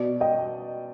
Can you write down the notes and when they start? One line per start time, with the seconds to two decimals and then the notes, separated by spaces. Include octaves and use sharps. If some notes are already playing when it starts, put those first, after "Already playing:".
Already playing: B2 D5
0.20 D#5 G5